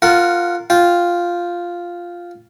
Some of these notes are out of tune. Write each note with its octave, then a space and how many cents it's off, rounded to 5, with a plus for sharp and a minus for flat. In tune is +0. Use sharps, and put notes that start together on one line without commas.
F4 +0 A#4 -20 F#5 +0
F4 +0 G5 +0